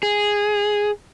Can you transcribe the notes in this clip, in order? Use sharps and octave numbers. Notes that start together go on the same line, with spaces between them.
G#4